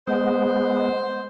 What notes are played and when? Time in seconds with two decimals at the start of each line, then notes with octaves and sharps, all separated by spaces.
0.07 G#3 B3 C5